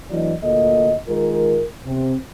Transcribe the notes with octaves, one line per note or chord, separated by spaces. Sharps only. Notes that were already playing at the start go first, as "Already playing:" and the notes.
E3 F#3 A3 D4 D5 D#5
D2 A#2 A#3 A4 D#5
D#3 G#3 F4 A#4
C3 C4